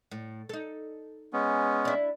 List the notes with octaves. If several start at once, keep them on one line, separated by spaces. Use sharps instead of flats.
A2
D#4 A4
G#3 B3 C#4
D4 E4